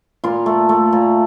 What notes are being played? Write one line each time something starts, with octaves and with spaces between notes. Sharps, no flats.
A#2 F4
A3
A3
A#2